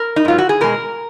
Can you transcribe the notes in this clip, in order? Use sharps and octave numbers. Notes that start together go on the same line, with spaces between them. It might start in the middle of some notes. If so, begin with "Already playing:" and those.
Already playing: A#4
D#4
G#2 F#3 F4
F#4
G#4
B2 G#3 A#4